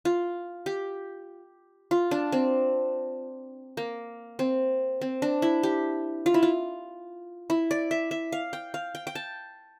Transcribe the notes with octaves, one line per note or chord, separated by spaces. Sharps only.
F4
G4
F4
D4
C4
A#3
C4
C4
D4
E4
G4
F4
E4
F4
E4
D5
E5
E5
F5
G5
F5
G5
G5
A5